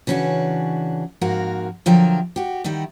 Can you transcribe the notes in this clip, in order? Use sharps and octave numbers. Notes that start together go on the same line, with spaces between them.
C#3 E3 C#4 D4 F#4
F2 G#2 A#3 F#4 A#4
D3 F3 F#3 A#4 E5 G5
F#4 G4
D#3 G3 D#4 E4